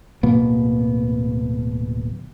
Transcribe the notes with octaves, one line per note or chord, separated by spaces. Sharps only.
D1 B2 A#3 B3